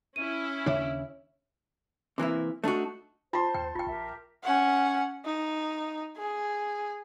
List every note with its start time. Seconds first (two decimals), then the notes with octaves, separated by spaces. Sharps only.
0.16 C#4 E4 D#7
0.66 D#2 C#3 D4 C#5 E5
2.18 C3 E3 A#3 E4
2.64 A3 D4 D#4 F#4
3.33 F4 C5 A5 C6
3.54 D#2 G5
3.75 E1 F4 G5 C#6
3.87 A#1 G4 A#4 E5
4.44 C#4 F#5
5.25 D#4
6.17 G#4